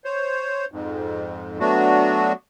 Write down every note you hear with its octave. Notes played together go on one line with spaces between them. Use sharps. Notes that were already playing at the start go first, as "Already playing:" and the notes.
C5 C#5
F2 G#2
F#3 A3 B3 D4 F#4